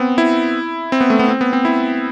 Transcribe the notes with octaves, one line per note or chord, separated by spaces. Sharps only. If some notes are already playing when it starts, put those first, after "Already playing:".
Already playing: B3 C4
E4
C4
B3
A3
B3
C4
B3
C4
E4